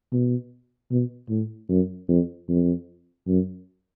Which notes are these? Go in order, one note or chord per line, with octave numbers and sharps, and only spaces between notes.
B2
B2
A2
F#2
F2
F2
F#2